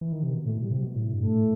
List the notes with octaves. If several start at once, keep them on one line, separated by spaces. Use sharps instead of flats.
E3
D#3
C3
B2
A2 A3
G3
C3
F#3
B2
A2
G2
A3
A2